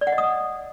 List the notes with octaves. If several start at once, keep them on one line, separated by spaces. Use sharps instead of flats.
D5
F#5
D#5
D#6